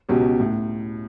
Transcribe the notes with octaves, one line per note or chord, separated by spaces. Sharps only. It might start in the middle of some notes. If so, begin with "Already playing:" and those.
C#2 B2 F#3 C#4 G4
A2